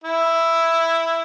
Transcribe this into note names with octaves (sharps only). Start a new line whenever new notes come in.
E4